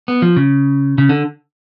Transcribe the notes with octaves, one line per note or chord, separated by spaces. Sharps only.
B3
F3
C#3
C#3
D3